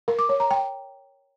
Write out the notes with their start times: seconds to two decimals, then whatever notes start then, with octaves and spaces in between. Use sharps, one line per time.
0.08 A#4
0.19 D6
0.29 C#5
0.40 A#5
0.51 G5